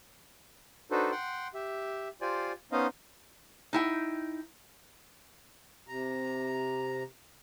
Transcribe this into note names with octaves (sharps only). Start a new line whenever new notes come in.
D4 D#4 F#4 A4 B4 C5
F#5 G5 C6
G4 E5
F4 G4 C5 D5 G#5
B3 C#4 D#4 C5 D#5 F5
D#4 E4 G5
C3 A#5